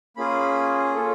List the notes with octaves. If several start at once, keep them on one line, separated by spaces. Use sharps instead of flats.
A#3 C#4 F4 G#4 B5
C#4 F4 A4